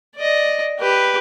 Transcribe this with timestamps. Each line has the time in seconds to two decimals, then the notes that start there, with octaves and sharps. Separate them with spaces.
0.16 D5 D#5
0.79 G4 B4